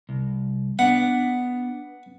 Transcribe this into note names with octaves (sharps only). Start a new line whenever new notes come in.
C2
B3 D4 F#5